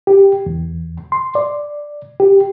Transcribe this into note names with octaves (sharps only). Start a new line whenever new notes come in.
G4
E2
C6
D5
G4